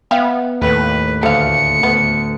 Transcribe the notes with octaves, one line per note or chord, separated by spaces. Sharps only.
B3 E5 F5 G5
D#2 A2 B4
D2 D3 F5 C#7
D2 B3